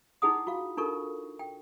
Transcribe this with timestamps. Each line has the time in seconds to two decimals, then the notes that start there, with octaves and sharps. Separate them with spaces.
0.22 D#4 E4 G#4 F#5 D#6
0.47 F4 F#4 F5
0.77 D4 D#4 F4 A4 A#4 C#6
1.39 G5